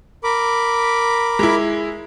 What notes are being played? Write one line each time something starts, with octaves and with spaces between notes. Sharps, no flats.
A#4 B5 D6
G#3 E4